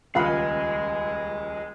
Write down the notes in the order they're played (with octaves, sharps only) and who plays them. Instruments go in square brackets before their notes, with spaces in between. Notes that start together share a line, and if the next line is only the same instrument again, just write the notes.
[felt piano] D#1 C#2 B5 [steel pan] F4 F5 F#5 [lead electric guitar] G#4 D#5